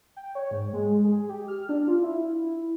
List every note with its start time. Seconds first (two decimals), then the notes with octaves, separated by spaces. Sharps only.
0.16 G5
0.35 C#5
0.51 G#2
0.73 G#3
1.05 G#4
1.29 G4
1.48 F6
1.69 D4
1.88 F4
2.03 E4